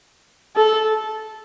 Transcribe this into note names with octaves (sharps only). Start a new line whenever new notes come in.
A4